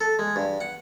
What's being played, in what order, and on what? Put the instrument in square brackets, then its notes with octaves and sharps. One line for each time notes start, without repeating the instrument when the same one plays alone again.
[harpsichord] A4
G#3
G2
F#5